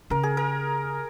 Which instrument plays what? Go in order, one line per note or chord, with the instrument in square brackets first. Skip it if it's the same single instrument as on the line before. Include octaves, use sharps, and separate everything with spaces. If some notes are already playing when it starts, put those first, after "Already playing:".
[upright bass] C#3 [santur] A#4
[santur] G#4
A#4